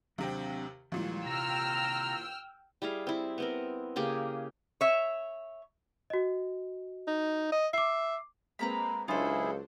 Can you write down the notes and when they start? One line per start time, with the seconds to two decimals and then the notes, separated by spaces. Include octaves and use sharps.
0.18 D#2 C3 F#3 C4 D4 G5
0.92 D#2 A#2 E3 F3 G3 G#3
1.26 C3 G5 A#5 E6 F6
2.82 G3 E4 G#4 F5
3.07 C4 E4
3.38 B3 C4 A#4
3.96 C#3 A#3 G4 G#4
4.81 C#5 E5
6.10 F#4 D#5
7.07 D#4
7.52 D#5
7.73 E5 D6 C7
8.59 G#3 A#3 C4 B4 A#5 B5
9.08 C#2 F#3 D4 E4 F4 G#4 A4 C5